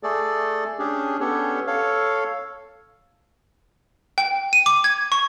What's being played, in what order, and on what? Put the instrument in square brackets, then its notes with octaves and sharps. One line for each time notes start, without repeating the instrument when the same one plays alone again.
[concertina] A3 G#4 A4 D5
C#4 D4 G4 G#4
B3 C#4 D4 G4 A4 C#5
A4 C#5 F5
[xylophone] G5
D#7
D6
G#6
C#6